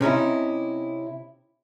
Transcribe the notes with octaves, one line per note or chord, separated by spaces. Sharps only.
C3 C#4 D#4 E4